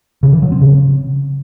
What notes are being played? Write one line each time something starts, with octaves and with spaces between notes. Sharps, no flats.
C#3
E3
F#3
C4
C#3